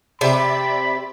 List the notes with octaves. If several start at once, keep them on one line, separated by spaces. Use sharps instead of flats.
C3 D5 E5 G5 B5